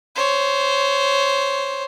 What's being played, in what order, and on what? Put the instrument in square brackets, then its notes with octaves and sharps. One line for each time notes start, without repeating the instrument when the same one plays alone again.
[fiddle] C5 C#5